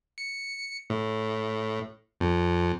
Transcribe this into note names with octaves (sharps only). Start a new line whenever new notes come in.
C#7
A2
F2